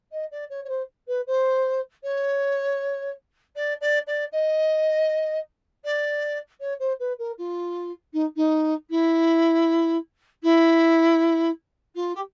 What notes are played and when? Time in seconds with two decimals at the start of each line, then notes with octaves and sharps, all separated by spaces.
0.11 D#5
0.31 D5
0.49 C#5
0.64 C#5
0.68 C5
1.07 B4
1.26 C5
2.03 C#5
3.55 D5
3.80 D5
4.07 D5
4.32 D#5
5.84 D5
6.60 C#5
6.79 C5
6.99 B4
7.18 A#4
7.37 F4
8.13 D#4
8.36 D#4
8.90 E4
10.42 E4
11.95 F4
12.15 G4